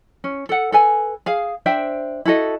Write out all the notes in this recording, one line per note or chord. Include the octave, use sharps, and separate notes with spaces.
C#4
A4 F#5
A4 B4 G#5
G#4 F5
D4 C5 E5 G5
E4 F#4 A4 D#5